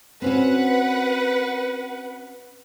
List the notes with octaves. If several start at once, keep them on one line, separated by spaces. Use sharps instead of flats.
C4 C#4 F#4 B4 F#5